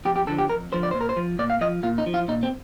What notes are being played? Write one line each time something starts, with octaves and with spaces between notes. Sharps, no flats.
F2 G4
G4
D3 F3 A4
G4
F2 A#4
D3 F3 C5
D5
A#2 C5
A#4
C5
F3
A#2 D5
F5
F3 D#5
A#2 F4
D#4
F3
F4
A#2 D#4
C4